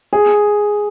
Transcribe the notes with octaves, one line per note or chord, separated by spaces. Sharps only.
G#4